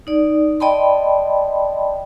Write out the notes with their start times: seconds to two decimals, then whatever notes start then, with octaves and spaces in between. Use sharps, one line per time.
0.07 D#4 D5
0.60 D5 D#5 G5 A5 B5 C6